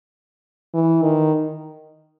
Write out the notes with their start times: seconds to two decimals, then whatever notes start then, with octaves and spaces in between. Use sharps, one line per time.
0.74 E3
1.02 D#3